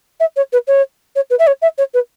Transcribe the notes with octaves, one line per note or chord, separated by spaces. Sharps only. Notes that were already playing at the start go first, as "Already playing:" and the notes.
E5
C#5
B4
C#5
C#5
B4
E5
C#5
E5
C#5
B4